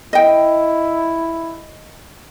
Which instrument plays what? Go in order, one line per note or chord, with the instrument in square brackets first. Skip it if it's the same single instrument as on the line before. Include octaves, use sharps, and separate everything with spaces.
[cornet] E4 [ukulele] D#5 G5